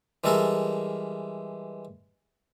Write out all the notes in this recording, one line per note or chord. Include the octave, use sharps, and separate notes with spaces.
E3 G3 G#3 A4 A#4